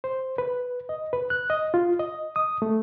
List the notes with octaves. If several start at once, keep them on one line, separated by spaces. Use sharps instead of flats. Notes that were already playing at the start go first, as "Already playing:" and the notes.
C5
B4
D#5
B4
F#6
D#5
F4
D#5
D#6
A3